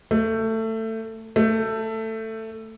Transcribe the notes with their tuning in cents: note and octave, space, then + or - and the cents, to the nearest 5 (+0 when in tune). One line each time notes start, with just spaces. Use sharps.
A3 +20
A3 +15